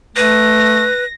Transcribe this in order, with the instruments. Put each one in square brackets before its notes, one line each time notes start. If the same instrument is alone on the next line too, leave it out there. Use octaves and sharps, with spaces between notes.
[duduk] A3 [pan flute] B4 [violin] A#6